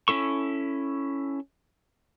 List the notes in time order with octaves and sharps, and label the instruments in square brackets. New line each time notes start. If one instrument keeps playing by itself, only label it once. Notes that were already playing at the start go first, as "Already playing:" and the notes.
[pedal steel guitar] C#4 E4 A4 C#6